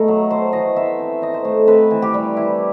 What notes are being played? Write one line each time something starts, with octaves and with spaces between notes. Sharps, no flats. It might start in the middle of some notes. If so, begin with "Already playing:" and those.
Already playing: A3 B3 D#4
F#3
D#4 C5
E3 D#5
B3 E5
C4
D#4 D#5
C5
A3
C4 B4
E3
G4
G3
E4